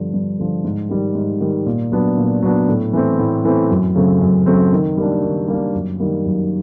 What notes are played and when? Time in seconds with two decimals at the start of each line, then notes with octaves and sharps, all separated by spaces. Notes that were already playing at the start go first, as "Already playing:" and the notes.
Already playing: G2 D3 F3
0.14 G2
0.39 D3 F3
0.64 G#2
0.89 D#3 G3
1.15 G#2
1.41 D#3 G3
1.66 A#2
1.92 F#3 B3 D4
2.17 A#2
2.43 F#3 B3 D4
2.68 A2
2.93 E3 A3 C4
3.19 A2
3.45 E3 A3 C4
3.71 F#2
3.95 C#3 F#3 A3 C4
4.21 F#2
4.46 C#3 F#3 A3 C4
4.73 D#3
4.97 G3 A#3 D4
5.23 D#3
5.48 G3 A#3 D4
5.74 F#2
6.00 D#3 G3 A#3
6.25 F#2